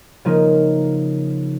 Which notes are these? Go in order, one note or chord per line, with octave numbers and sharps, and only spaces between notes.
C#3 F3 A#3 D#4